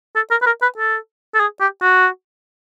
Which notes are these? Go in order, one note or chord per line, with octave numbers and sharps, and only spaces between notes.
A4
A#4
B4
A#4
B4
A4
A4
G#4
G4
F#4